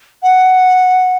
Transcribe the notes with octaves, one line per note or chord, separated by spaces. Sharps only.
F#5